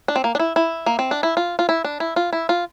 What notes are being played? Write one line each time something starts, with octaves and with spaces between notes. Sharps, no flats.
D4
C4
A#3
D4
E4
E4
A#3
C4
D4
E4
F4
F4
E4
D4
E4
F4
E4
F4